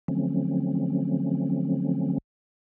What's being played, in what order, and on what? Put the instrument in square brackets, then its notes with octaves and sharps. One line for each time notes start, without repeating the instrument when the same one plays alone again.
[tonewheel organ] D3 F3 F#3 A3 C4 C#4